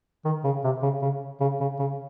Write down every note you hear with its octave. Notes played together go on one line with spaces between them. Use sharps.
D#3
C#3
C3
C#3
C#3
C#3
C#3
C#3